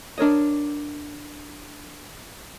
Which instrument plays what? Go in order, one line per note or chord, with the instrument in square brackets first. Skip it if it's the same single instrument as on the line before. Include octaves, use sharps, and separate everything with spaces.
[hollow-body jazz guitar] D4 A#4 C#5 D#5